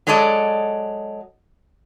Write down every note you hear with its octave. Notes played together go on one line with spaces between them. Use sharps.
F#3 G#3 A4 D5 D#5